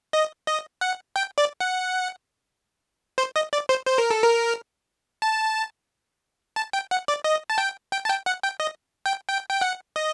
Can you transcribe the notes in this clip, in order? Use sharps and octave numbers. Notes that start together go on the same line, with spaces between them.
D#5
D#5
F#5
G5
D5
F#5
C5
D#5
D5
C5
C5
A#4
A4
A#4
A5
A5
G5
F#5
D5
D#5
A5
G5
G5
A5
G5
F#5
G5
D#5
G5
G5
G5
F#5
D#5